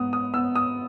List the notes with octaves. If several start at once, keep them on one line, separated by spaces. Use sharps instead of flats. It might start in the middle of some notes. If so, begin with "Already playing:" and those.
Already playing: G#2 B3 D#6
D#6
B3 E6
D#6